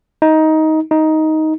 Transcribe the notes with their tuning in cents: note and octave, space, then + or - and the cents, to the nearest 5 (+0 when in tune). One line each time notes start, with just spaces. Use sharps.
D#4 +15
D#4 +10